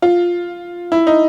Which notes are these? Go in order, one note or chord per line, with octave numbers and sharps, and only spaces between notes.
F4
E4
D#4